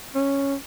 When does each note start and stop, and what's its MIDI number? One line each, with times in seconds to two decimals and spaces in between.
0.15 0.55 61